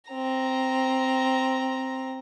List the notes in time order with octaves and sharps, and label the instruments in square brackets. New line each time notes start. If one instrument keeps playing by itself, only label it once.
[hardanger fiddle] C4 A#5